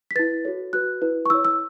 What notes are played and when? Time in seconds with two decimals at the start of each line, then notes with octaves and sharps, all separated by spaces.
0.11 B6
0.15 E4 B4 A6
0.45 F#4 A4 C#5
0.73 F#4 B4 F#6
1.02 E4 B4
1.26 C#6
1.30 E4 C#5 E6
1.45 E6